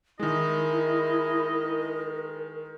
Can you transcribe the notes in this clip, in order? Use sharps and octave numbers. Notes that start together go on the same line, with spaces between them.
D#3 G#3 E4 A#4 D#5